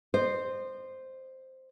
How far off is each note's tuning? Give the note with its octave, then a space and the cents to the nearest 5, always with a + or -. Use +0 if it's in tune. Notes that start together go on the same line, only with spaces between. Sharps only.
C5 +0 D#5 -35